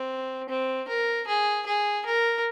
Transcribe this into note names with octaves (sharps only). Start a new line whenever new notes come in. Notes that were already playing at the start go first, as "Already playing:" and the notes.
Already playing: C4
C4
A#4
G#4
G#4
A#4